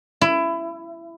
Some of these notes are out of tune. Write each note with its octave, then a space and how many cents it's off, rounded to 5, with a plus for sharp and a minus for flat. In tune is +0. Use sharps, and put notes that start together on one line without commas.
E4 +20